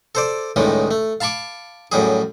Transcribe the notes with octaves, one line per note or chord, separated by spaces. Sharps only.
A4 C5 D5
C#2 A2 D#3 G3 G#3
A3
F5 A5 B5 C#6 D6
F#2 A2 G3 G#4